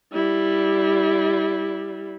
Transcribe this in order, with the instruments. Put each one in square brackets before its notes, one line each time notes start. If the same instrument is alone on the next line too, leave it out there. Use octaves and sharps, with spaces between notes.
[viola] G3 E4